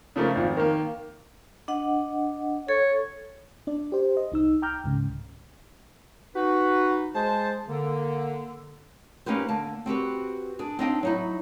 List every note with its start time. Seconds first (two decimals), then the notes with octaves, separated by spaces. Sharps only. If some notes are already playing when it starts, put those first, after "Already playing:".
0.16 C#3 F3 A3 A#3 C#4
0.35 G#1 F3
0.57 D#3 A#3
1.68 D4 D#5 F#5
2.69 A4 C#5
3.67 D4 D5
3.92 G4 C5
4.17 D#5
4.32 C2 D#4 E6
4.62 G5 A#5 D6 F6 G6
4.84 C#2 G#2 C#3
6.36 D#4 F#4 B4
7.15 G#3 C5 A5
7.69 D3 A#3
9.26 A#3 C#4 D#4 G4 B4 C5
9.49 D3 A#3 A5
9.86 C4 F#4 G4 B4
10.59 D4 G#4
10.79 C4 D4 D#4 D#5 F5 G5
11.03 F#3 D#4 E4